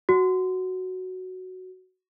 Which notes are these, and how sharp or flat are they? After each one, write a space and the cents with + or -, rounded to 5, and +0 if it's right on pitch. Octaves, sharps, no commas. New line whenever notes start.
F#4 +0